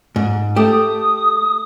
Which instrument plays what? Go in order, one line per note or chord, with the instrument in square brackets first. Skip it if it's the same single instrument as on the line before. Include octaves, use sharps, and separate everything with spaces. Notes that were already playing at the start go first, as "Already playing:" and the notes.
[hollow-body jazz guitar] G#2
[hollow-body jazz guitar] A3 G4 [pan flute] D#6